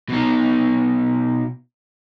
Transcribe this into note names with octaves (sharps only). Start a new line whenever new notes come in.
B2 D#4